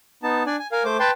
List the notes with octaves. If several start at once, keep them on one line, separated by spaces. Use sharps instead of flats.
B3 D#4 A5
D4 D5 G#5
G#5
A#4 F5 G#5
A3 C5 D6
B4 G5 A5 C6